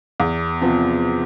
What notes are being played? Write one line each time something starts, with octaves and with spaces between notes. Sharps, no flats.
E2
C3 F3 B3